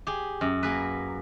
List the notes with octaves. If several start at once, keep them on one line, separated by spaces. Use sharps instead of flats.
G4 G#4
F#2
A#3 G#4 B4